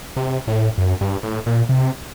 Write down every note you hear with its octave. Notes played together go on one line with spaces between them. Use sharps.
C3
A2
F#2
G2
A2
A#2
C3